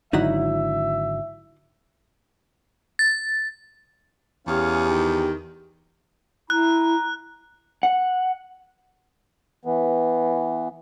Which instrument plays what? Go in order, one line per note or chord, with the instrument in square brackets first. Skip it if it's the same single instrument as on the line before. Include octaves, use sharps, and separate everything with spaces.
[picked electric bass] G#1 D3 F#3 [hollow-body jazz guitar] D#4 E4 F#5 [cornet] E5
[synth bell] A6
[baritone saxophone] E2 [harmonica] C#4 G#4 F5 [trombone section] G4
[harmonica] D#3
[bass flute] E4 [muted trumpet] A#5 [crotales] F#6
[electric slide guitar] F#5
[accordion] E3 B3